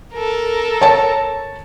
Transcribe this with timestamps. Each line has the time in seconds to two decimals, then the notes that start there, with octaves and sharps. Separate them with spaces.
0.15 A4 A#4
0.82 C#5 A5